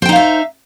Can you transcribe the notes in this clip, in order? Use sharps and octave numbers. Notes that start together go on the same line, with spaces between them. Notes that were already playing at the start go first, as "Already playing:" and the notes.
D#4 C5 E5 F5 G5